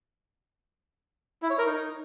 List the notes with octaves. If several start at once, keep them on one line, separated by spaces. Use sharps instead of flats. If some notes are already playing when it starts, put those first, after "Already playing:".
E4
C#5
A#4
D#4